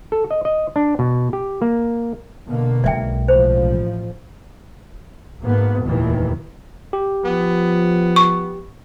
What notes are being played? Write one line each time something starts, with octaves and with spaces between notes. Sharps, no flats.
A4
D#5
D#5
D4
B2
G4
A#3
B2 D3 A#3
B1 G#3 D5 E5 G5
A1 F3 C5
G#1 G#2 A#3 B3
F1 D#2 A#2 D#3 E3
G4
F3 B3
C#6